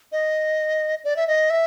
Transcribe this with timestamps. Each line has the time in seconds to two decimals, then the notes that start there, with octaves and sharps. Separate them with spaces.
0.12 D#5
1.04 D5
1.17 E5
1.28 D#5
1.50 E5